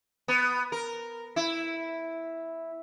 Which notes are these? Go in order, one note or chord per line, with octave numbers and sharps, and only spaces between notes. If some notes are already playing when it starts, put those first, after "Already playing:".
B3
A#4
E4